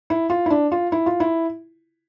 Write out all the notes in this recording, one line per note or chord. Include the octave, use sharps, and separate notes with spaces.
E4
F4
E4
D4
F4
E4
F4
E4